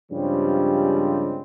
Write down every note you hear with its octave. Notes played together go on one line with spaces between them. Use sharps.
G2 C#3 F3 G3 G#3 C4